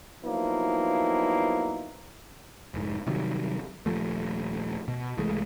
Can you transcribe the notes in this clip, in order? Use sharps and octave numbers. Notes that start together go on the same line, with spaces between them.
F3 F#3 A#3 B3 D#4 E4
F1 G#2
C3 D#3 F#3 G3
D#1 F2 F3 A3
B2
C2 E3 G#3 A3